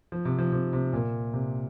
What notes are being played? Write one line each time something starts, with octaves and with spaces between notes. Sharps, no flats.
F3
C3
F3
C3
C3
A#2
C3